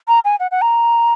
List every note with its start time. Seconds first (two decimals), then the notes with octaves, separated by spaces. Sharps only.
0.08 A#5
0.25 G#5
0.40 F#5
0.51 F#5
0.62 A#5